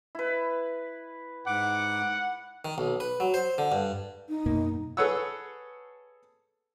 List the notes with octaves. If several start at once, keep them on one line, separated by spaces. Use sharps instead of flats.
E4 B4
G#2 F#5 D6
D#3
B1
B4
F#3
C5
D3
G2
D#4
F#2 B2 A#3
G#4 A4 B4 C#5 F#5 E6